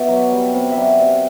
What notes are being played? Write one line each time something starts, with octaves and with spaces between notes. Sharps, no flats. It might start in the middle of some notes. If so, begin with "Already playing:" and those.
Already playing: B2 D5 E5
F#3
G3
C3
E5
F#3 D5
C3 D5